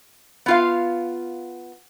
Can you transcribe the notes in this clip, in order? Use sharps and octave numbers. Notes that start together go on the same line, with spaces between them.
B3 F4 F5